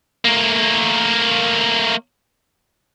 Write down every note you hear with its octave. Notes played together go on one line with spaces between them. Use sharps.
A3 A#3